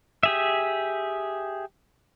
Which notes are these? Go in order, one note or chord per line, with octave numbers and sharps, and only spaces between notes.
G4 G#4 E5